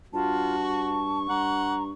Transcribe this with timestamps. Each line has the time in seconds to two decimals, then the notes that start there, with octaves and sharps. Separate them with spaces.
0.13 G2 F4 F#4 A5
0.61 C#6
1.29 G2 F#5 A#5